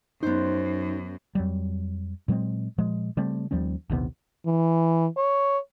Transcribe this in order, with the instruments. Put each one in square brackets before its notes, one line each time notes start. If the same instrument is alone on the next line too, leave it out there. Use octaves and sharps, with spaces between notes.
[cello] F#2 [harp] B3 C5 [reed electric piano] D#4
[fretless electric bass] F2 F#3 G3
A#2 F#3 G#3 C4
A#2 F3 G#3
C#3 G3 A3 C4
D#2 F3 G3 C#4
A#1 D#2 C3 B3
[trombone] E3
C#5